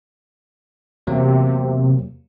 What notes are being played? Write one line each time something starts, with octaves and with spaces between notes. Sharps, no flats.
E2 C3 F#3 A#3